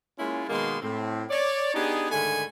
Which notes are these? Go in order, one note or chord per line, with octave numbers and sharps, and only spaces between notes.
G#3 A#3 C#4 E4 F4
B2 D#3 G#3 A#3 B3 C6
A2 C4
C#5 D5
B3 D4 D#4 G4 G#4
G#2 D3 D#3 A3 G#5 B5